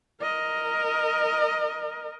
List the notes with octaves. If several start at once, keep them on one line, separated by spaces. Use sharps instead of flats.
A#4 D#5